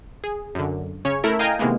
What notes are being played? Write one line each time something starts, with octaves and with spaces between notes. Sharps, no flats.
G#4
F#2 D3
C#3 C#4 C#5
A3 E4 A4 A#4
D#5 F5 G5 G#5 A#5 D#6
C3 D#3 E3 G#3 A#3 B3